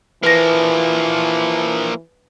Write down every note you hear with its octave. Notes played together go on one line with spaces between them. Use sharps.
E3 F3 A#3 B4 A#6